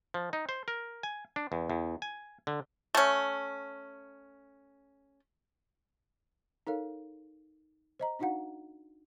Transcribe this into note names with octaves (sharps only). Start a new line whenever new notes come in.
F3
D#4
C5
A#4
G#5
D4
E2
E2
G#5
D3
A3 C#4
D#4 A4 A#4 C#5 F5
C5 D#5 A#5
D4 D#4 F#4 F5 F#5